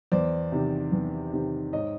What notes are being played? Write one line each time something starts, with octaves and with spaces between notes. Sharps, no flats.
E2 C5 D5
C3 D#3
E2
C3 D#3
G#2 C#5 D#5